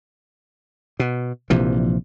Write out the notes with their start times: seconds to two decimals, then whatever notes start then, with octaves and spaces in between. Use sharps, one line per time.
1.00 B2
1.50 A#1 C3 E3 F3